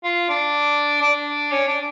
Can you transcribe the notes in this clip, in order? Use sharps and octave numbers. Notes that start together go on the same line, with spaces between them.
F4
D4
D4
C#4
D4